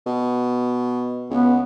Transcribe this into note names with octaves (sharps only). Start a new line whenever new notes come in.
B2
C#2 B3